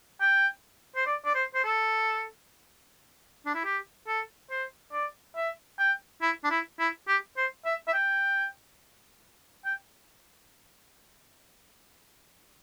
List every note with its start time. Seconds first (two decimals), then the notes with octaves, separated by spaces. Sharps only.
0.21 G5
0.96 C5
1.06 D5
1.25 D5
1.35 C5
1.54 C5
1.64 A4
3.46 D4
3.55 E4
3.64 G4
4.07 A4
4.50 C5
4.92 D5
5.36 E5
5.79 G5
6.22 E4
6.44 D4
6.50 E4
6.79 E4
7.08 G4
7.37 C5
7.65 E5
7.87 E5
7.94 G5
9.65 G5